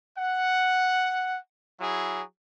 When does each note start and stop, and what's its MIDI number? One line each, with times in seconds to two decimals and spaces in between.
0.18 1.38 78
1.81 2.23 54
1.81 2.23 64
1.81 2.23 68